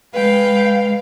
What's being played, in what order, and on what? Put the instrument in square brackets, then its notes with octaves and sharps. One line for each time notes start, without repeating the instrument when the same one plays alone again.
[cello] G#3 F5 [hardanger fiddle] B4 G5